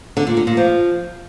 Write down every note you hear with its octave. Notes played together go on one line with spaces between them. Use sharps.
D3
A#2
D3
A#2
F3